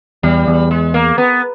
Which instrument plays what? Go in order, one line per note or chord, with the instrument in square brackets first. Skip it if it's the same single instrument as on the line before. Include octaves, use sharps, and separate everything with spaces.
[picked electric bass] E2 [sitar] G3
[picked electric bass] E2
[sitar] G#3
A#3
B3